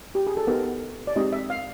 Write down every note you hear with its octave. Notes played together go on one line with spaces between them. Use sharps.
G4
G#4
A4
B3 D#4 G4 A#4
D5
G#3 C4 D#4 G4 D#5
E5
F5